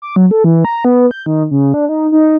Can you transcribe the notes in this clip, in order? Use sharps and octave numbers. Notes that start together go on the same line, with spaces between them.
D6
F#3
A4
E3
A#5
B3
G6
D#3
C#3
D4
D#4
D#4